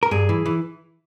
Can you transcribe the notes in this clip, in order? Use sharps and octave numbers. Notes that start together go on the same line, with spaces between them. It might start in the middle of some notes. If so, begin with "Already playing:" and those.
A#4
G2 G#4
E3
E3